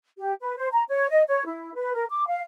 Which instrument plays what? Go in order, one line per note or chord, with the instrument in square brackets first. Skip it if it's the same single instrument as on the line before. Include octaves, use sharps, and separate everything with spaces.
[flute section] G4
B4
C5
A#5
C#5
D#5
C#5
E4
B4
A#4
D6
F5